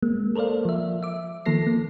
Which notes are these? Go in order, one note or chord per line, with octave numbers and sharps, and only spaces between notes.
G#3 A#3
A4 A#4 C5 D5 F5
F3 E5
E5 D6
D#3 F3 A#3 A4 A#6 C7
A#3